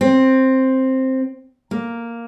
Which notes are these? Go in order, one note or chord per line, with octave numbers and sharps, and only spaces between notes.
C4
A#3